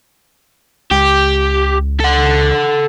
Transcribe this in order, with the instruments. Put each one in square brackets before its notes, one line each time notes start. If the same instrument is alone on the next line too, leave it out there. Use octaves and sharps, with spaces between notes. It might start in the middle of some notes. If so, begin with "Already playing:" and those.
[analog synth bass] C#2 [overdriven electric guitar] G4
[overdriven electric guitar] A4 F#5